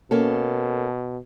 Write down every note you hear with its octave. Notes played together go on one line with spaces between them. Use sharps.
B2 A#3 C#4 A4